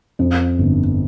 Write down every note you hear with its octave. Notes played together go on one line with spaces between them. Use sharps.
F2
G1